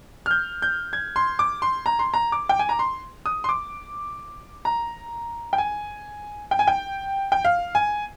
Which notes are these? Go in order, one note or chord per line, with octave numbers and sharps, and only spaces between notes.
F6
G6
G6
G#6
C6
D6
C6
A#5
C6
A#5
D6
G5
G#5
A#5
C6
D#6
C6
D6
A#5
G5
G#5
G5
G#5
G5
G5
F5
G#5